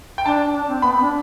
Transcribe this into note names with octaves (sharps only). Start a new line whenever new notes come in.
G5
D4 A5
D4
C4
B3 B5
C4
D4